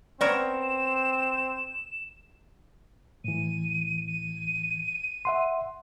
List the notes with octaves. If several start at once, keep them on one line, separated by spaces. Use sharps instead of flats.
B3 C4 A#4 C#5 D5 E7
A2 E3 D#7
D#7
E5 F#5 C6